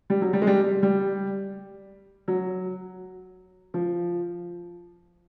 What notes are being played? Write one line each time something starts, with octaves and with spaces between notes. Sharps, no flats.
G3
F#3
G3
G#3
G3
G3
F#3
F3